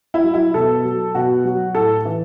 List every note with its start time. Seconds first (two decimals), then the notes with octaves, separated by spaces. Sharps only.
0.14 E4
0.24 F#3
0.34 E4
0.54 B2 A4
0.85 F#3
1.15 B2 F#4
1.45 F#3
1.75 A2 A4
2.05 E3